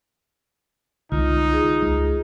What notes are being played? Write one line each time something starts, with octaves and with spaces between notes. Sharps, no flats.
C2 D3 G#3 D#4 F4
F4 G#4
C#2 G#3